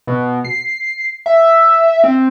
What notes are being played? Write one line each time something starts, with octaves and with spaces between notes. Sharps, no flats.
B2
C7
E5
C4